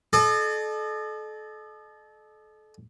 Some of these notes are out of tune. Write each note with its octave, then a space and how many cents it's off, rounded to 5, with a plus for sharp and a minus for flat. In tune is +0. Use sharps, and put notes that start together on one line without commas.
A4 -35 D#5 -45